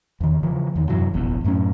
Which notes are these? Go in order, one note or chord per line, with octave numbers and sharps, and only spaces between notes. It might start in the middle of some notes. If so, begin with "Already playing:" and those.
E2 D#3
C#3 E3 F3
E2 D#3
F#2 C3 E3 F#3
F1 A#1 E2
F#2 A2 F#3 C#4